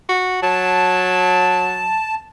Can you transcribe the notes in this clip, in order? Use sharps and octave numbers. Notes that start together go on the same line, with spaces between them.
F#4
F#3 A5